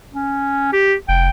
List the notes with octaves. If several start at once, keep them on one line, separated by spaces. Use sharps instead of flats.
C#4
G4
F1 G5